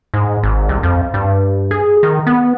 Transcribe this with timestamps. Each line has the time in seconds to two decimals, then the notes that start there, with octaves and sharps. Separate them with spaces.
0.14 G#2
0.43 G#1
0.69 C2
0.83 F2
1.14 G2
1.71 G#4
2.03 D#3
2.27 B3